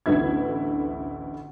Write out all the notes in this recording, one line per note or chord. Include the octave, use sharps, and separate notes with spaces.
A1 D2 D3 B3 E4 G#6